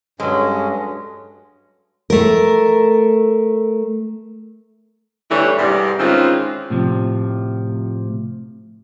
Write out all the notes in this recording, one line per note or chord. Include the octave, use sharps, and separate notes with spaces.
G2 F#3 G#3 C#4 A4 C#5
A3 A#4
D3 E3 G3 A3 E4 C#5
G#2 C3 E3 G3
D#3 E3 G#3 C4 C#4 F4
A2 C3 F3